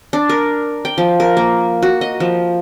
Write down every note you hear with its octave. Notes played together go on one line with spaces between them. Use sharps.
D4
A#4
G5
F3
A#4
A#3
F#4
D#5
F3